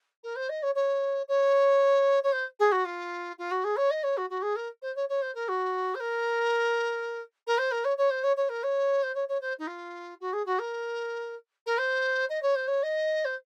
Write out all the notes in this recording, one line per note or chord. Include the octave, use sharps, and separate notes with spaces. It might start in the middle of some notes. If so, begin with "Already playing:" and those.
A#4
C5
D#5
C#5
C#5
C#5
C#5
C5
G#4
F#4
F4
F4
F#4
G#4
C#5
D#5
C#5
F#4
F#4
G#4
A#4
C5
C#5
C#5
C5
A#4
F#4
C5
A#4
A#4
C5
A#4
C#5
C#5
C5
C#5
C#5
A#4
C#5
C5
C#5
C#5
C5
D#4
F4
F#4
G#4
F#4
A#4
A#4
C5
D#5
C#5
C5
C#5
D#5
C5